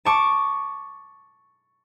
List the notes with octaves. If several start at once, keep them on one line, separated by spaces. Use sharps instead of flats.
A5 C#6 D6